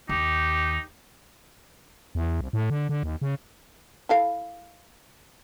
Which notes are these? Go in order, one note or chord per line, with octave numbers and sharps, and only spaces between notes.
D#2 D#4 G4
E2
C2
A2
D3
D3
D#2
C#3
E4 A4 F5